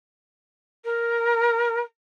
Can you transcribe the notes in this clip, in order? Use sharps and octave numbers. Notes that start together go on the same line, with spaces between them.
A#4